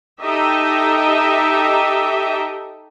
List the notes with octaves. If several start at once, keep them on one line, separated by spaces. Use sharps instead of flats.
D#4 G4 A4 D#5 E5